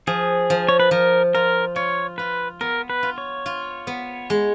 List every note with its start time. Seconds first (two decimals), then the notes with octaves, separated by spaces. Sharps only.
0.07 F3 G#4
0.50 F3
0.69 C#5
0.80 B4
0.91 F3 A#4
1.35 F4 A#4
1.76 F4 C#5
2.18 F4 B4
2.61 B3 A#4
2.90 B4
3.03 F4
3.18 C#5
3.46 F4
3.87 B3
4.30 G#3